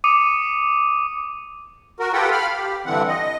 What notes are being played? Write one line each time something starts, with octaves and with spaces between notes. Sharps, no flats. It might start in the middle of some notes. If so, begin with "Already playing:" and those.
D6 D#6 C#7 D#7
F#4 A#4
F4 G4 A4 B4 F#5 G5
F5 B5 F6
G4
G2 D3 E3 C4 F#5
D#5